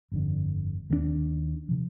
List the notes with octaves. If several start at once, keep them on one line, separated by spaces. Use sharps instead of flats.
G1 F2 D3
D#2 D#3 A#3 D4
C3 F3